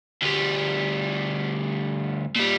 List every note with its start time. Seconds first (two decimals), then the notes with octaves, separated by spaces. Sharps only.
0.22 D2 G3
2.36 A#2 G3